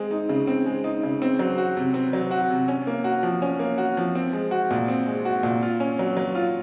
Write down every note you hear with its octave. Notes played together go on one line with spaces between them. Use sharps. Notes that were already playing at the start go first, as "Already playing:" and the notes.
Already playing: G#3 C4
D#4
C#3
C4
G#3
D#4
C#3
C4
F#3
F#4
C3
C4
F#3
F#4
C3
C#4
A#3
F#4
F3
C#4
A#3
F#4
F3
C4
G#3
F#4
A#2
C4
G#3
F#4
A#2
F4
C#4
F#3
F#3
F4